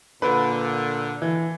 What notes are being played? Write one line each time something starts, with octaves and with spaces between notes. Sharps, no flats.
A#2 D3 B4
E3